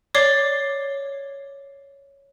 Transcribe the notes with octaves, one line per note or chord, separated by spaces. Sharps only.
C#5 D5 D6 C7 G7